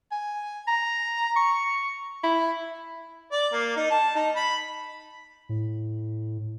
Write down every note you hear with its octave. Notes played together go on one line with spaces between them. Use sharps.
G#5
A#5
C#6
E4
D5
A#3
D#4
A5
D#4
B5
A2